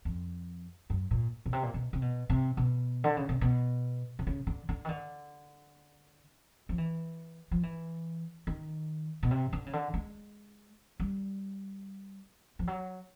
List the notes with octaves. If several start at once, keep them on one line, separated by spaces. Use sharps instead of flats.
F2
F#2
A#2
B2
C3
A#2
B2
C3
B2
C3
B2
D3
C#3
C3
B2
C3
C#3
D3
D3
D#3
D3
F3
E3
F3
E3
D#3
B2
C3
D3
C#3
D3
G#3
G3
F3
F#3